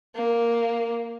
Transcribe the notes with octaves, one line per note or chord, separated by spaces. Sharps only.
A#3